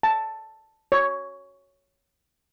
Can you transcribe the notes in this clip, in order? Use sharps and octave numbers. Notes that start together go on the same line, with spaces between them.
A5
C#5